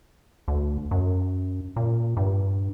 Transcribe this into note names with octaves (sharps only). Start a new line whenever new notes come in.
D2
F#2
A#2
G2